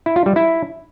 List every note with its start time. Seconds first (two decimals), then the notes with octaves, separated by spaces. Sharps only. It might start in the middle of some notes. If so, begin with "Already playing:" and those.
0.06 E4
0.16 F4
0.26 G3
0.36 E4